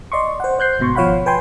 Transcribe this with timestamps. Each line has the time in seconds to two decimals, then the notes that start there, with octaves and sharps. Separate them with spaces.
0.12 D5 D#5 C6 C#6
0.40 C5 F#5
0.59 C5 F#6 G6 C7
0.79 G1 G#2 B2 C6 C#6
0.95 G#1 F3 C#5 F5 F#5 B5
1.26 B4 G5 G#5 C6 G6